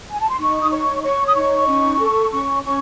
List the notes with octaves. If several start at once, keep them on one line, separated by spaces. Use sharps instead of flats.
G#5
A5
C6
D#4 C#6
D#6
C#5 C#6
C#5 C#6
D#6
D#4 C#6
C#4
A4
C#4 C#6
C#4 C#6